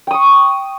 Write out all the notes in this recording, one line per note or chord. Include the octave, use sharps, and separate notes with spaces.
G5 C#6 D#6